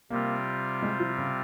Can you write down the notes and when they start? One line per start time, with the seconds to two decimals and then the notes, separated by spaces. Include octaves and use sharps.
0.10 C3 G3 A#3 C4 F4
0.82 G#3
1.00 F3
1.18 C#3